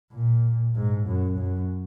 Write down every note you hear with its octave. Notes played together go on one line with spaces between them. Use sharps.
A#2
G#2
F#2
F#2